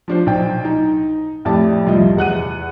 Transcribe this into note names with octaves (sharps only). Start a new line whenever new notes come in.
F3 D4 C5
B1 G5
D#4
F2 A2 E4 G4 D5 A5
C2 F3 D#5
E2 F#5 F#6 D#7